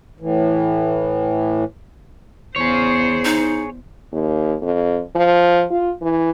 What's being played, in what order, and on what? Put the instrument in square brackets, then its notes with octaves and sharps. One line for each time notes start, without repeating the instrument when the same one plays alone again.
[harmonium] A2 E3
[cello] E2 C5 [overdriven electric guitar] G#4 C#5
[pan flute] D#4
[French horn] D#2
F2
F3
F4
E3